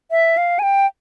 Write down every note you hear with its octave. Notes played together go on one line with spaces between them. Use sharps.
E5
F5
G#5
G5